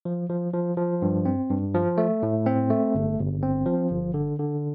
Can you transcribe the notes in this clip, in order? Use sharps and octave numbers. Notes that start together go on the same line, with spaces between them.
F3
F3
F3
F3
G2
C4
G2
F3
A3
A2
C4
A3
G1
G1
C4
F3
G1
D3
D3